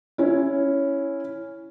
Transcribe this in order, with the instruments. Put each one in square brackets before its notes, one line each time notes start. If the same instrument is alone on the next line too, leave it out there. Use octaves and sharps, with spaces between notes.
[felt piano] C#4 E4